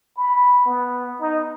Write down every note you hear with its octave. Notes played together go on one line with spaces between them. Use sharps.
B5
B3
D#4